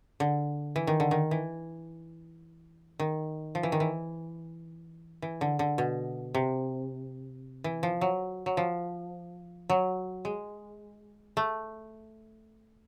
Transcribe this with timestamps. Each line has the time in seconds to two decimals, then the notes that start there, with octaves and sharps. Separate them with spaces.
0.20 D3
0.76 E3
0.87 D#3
1.00 D3
1.11 D#3
1.31 E3
3.00 D#3
3.55 F3
3.63 E3
3.72 D#3
3.80 E3
5.22 E3
5.41 D3
5.59 D3
5.78 B2
6.35 C3
7.64 E3
7.83 F3
8.01 F#3
8.46 F#3
8.57 F3
9.70 F#3
10.25 G#3
11.37 A3